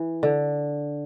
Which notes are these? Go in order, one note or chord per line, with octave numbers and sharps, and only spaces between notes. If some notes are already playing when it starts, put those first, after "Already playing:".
Already playing: E3
D3